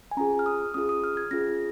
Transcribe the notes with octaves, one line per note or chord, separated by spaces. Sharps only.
G#5
C#4 F4 G#4 A#5
F6
D#6
C#4 F4 G#4 D#6
D#6
F6
G#6
C#4 F4 G#4 A#6